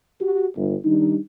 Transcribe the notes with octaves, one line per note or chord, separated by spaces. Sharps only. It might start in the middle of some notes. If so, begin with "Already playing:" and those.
F#4 G4
G1
D#3 G3 D4 D#4